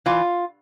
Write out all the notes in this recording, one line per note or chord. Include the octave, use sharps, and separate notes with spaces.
E3 F4